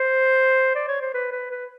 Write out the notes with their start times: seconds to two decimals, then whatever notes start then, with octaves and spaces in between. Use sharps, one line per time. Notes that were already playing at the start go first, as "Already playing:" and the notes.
Already playing: C5
0.75 D5
0.88 C#5
1.02 C5
1.14 B4
1.32 B4
1.51 B4